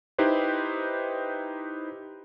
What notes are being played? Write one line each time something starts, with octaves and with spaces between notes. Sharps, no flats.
D#4 E4 G4 B4 C5